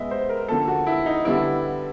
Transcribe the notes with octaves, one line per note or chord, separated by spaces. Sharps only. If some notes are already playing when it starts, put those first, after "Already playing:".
Already playing: B2 G#3 B3 D#5 E5
C5
A#4
D3 F3 A#3 A4
F#4
E4
D#4
D3 G3 B3 E4